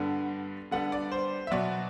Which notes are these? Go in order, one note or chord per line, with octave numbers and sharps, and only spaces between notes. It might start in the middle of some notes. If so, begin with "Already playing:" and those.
Already playing: G2 D3 G3 B3
D3 G3 B3 D4 F#5
D5
C5
E5
B2 F#3 B3 D5